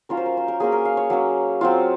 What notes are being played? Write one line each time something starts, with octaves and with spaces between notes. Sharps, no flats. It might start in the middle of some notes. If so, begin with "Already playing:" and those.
F#3 C#4 F4 A#4
C5
A#4
C5
A#4
F#3 A#3 C#4 G#4
A#4
F5
C#5
F#3 A#3 C#4
F#3 C4 F4